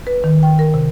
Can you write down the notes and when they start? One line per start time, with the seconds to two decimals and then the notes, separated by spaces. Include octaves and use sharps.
0.07 B4
0.24 D#3
0.43 G5
0.59 A#4
0.74 C3